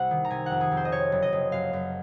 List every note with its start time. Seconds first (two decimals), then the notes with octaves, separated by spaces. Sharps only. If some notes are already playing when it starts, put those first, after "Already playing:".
Already playing: C2 C3 F#5
0.11 D#3
0.25 A#5
0.30 C3 G#5
0.46 F2 F#5
0.61 G#4
0.71 F2
0.77 C5
0.85 D#5
0.92 C3 C#5
1.12 F#1
1.22 D#5
1.33 F#1
1.52 F#2 F5
1.73 F#2